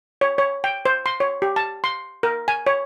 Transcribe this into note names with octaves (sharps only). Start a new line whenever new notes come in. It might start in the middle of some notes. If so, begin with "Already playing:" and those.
C#5
C#5
G5
C5
C6
C#5
G4
A5
C6
A#4
G#5
C#5